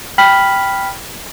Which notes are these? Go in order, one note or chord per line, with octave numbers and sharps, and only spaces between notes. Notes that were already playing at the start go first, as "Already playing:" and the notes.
G5 B5 F6 B6 F#7